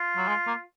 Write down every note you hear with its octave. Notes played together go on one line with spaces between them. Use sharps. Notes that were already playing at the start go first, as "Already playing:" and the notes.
Already playing: F4
F#3
G#3
A#3